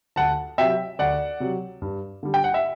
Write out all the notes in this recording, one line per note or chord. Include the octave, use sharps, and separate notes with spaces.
D2 F#5 A5
C3 F#3 E5 G5
D2 D5 F#5
C3 F#3
G2
D3 G3
G5
F#5
E5